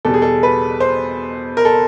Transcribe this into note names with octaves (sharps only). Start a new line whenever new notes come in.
E2 B2 G3 A4
G#4
A4
B4
C5
A#4
A4